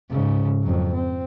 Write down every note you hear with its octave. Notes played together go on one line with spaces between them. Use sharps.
G#2 C#3
F2 F#3
C4